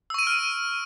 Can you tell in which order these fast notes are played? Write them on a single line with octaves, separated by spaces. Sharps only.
E6 C#6 D#7 D7 F6